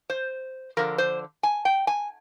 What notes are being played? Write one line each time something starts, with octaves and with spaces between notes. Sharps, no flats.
C5
D3 F3 A#4
C5
G#5
G5
G#5